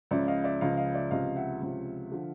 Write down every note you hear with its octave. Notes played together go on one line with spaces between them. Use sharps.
C#2 C#3 F3 D5 E5
D#5 F5
D5 E5
C#2 C#3 F3 D#5 F5
D#5 F5
D5 E5
C#2 C3 F3 D#5 F5
E5 F#5
C#2 C3 F3
D3 F3